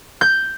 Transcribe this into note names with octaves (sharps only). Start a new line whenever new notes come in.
G6